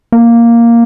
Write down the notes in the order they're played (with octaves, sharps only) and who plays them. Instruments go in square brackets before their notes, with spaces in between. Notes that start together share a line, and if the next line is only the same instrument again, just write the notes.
[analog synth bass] A#3